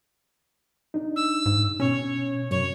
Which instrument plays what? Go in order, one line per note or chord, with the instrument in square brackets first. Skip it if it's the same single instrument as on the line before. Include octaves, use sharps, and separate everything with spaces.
[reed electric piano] D4 D#4
[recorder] E6
[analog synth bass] G#2
[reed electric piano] B2 [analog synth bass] C#4 [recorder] C#5
[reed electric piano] F#2 C3 [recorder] C#5